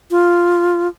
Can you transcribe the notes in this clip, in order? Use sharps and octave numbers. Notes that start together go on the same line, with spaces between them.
F4